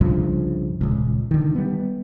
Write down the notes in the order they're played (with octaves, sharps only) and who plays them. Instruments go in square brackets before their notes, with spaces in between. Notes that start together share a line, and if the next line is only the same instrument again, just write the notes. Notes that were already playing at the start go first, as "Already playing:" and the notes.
[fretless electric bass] C2 G2 C#3 F3
D#1 C#2
D3 D#3
G3 B3